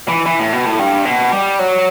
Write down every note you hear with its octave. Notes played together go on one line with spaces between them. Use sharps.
E3
E3
A2
B2
A2
G2
B2
G3
F#3